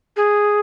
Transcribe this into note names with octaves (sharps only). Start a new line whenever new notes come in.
G#4